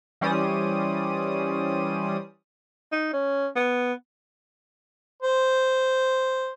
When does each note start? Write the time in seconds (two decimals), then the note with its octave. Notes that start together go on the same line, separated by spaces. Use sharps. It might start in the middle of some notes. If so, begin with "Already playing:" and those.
0.21 E3 G3 C#4 C5 D5 D#6
2.92 D#4
3.13 C#4
3.56 B3
5.22 C5